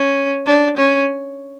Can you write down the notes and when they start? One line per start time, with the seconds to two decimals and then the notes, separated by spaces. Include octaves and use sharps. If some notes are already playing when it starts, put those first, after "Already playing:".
Already playing: C#4
0.47 D4
0.77 C#4